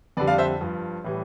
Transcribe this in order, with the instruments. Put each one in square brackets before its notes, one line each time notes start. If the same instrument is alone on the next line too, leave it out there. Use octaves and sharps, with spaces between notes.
[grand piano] F2 D3 G3 B4 D5
D5 F5
C5 E5
G2 F3
A2 E3 G3